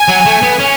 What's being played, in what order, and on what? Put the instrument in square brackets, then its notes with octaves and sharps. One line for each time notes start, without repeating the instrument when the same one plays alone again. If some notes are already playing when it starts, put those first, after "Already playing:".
Already playing: [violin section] G#5
[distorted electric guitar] F#3
A3
B3
C#4